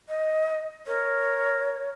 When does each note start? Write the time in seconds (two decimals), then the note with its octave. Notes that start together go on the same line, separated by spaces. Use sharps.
0.09 D#5
0.87 A#4 C#5